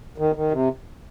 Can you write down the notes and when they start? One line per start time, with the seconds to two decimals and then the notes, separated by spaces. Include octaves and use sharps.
0.18 D#3
0.35 D#3
0.51 C3